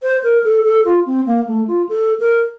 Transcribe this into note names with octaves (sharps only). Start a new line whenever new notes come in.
C5
A#4
A4
A4
F4
C4
A#3
A3
F4
A4
A#4